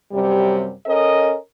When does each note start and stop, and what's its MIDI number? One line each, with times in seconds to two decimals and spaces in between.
0.12 0.71 42
0.12 0.71 48
0.12 0.71 55
0.86 1.36 61
0.86 1.36 69
0.86 1.36 70
0.86 1.36 75